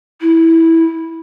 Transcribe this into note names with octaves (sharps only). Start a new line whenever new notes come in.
E4